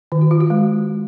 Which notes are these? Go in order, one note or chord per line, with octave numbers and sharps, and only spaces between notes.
D#3
F#4
F4
F#4
G#3